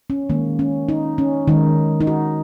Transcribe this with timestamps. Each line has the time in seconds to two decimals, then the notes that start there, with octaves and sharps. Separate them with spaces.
0.10 C#4
0.29 D#3 G#3 A#3
0.59 C#4
0.89 D#4
1.18 C#4
1.48 D#3 G#3 D#4
2.01 D#4
2.07 F#4